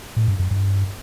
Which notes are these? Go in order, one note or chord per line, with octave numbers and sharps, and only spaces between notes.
A2
G2
F#2
G2